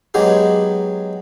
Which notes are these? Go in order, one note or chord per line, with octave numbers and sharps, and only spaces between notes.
F#3 G#3 B3 D#4 G4 G#4